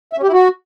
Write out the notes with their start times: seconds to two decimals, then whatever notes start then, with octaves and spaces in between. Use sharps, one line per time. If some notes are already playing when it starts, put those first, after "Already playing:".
0.13 E5
0.18 C#4
0.23 G4
0.28 E4
0.33 F#4